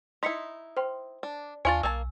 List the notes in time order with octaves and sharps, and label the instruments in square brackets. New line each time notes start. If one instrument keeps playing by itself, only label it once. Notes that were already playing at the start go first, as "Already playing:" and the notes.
[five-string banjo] D#4 E4 [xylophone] C6 B6 C#7
[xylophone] C5 G5 C6
[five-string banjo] D4
[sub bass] D#2 [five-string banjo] D4 F4 C#5 [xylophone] G#5 C#6 A6
[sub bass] B1 [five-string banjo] A#3 G#5 A5 [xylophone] E6